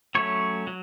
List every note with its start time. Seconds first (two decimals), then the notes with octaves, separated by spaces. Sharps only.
0.15 F#3 A3 C#4 C#5
0.67 F#3